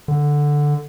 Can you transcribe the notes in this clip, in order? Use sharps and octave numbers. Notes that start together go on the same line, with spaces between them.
D3